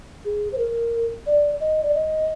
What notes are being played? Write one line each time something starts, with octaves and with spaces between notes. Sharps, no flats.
G#4
C5
A#4
D5
D#5
D5
D#5